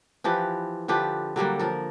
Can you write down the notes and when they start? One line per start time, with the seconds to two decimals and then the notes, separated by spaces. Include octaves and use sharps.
0.24 E3 F3 G4 B4
0.88 D3 F3 G4 B4
1.36 D3 F#3 G3 A#3
1.59 F3 A#4